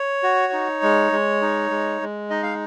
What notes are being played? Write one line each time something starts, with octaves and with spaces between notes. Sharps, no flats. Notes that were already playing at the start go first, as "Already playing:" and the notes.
Already playing: C#5
F#4
D#4
G#3
G#3
D#4
G#3
G#3
D#4 D#5
F5